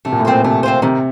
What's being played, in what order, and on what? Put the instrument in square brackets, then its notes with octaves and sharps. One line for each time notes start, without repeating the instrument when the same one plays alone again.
[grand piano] C3 [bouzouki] A3
[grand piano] A#2
A2
[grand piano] A#2 [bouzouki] C4 F4 C5
[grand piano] C3 [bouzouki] A3
[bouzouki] C4 F4 C5
[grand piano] C3 [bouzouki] D#3